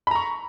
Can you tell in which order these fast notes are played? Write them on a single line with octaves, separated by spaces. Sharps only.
B5 A#5 C#6